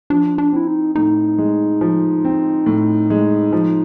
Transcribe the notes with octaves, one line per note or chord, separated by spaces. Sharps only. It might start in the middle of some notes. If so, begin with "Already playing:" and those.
F3 D4
D4
C4 E4
D#4
A2 D#4
G#3
F3
C4
A2
G#3
F3